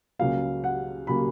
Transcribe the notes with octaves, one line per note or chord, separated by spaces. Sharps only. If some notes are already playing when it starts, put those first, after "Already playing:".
C#2 C#3 F#3 A#3 F5
F#5
C#3 F#3 A#3 B5